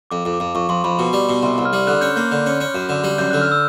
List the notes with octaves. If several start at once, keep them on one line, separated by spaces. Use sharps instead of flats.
F2 D6
F2
D6
F2
F2 C#6
F2 C6
F2 B5
B2
G3
B2
C2 C6
C2
F6
G3
D3 F#6
C#4 G6
A#3 G6
D3
C#4
C#4
F#2
D3
G3
F#2 G6
F#6
D3
F6
E6